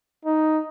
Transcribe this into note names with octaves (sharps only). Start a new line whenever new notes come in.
D#4